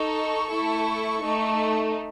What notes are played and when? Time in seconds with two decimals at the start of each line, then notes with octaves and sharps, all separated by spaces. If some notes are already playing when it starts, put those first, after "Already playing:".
Already playing: D#4 A4 C#6
0.50 A3 E4 A4
1.22 A3 D#4 A4